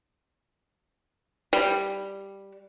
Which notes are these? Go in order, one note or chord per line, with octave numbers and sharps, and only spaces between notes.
G3